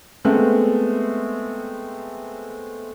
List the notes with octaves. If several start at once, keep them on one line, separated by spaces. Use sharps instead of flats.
G#3 A3 B3 C4